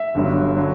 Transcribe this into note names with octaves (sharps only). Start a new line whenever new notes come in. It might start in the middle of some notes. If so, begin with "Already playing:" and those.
Already playing: E5
G1 G2 D3 F#3
D3 F#3